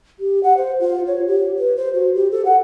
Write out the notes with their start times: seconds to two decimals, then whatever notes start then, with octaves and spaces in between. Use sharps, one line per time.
0.20 G4
0.43 F#5
0.57 C5
0.80 F4
1.07 C#5
1.27 G4
1.58 B4
1.76 C5
1.94 F#4
2.15 G4
2.31 A4
2.45 F#5